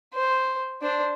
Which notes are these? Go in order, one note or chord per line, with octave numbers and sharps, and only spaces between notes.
C5
D4 C5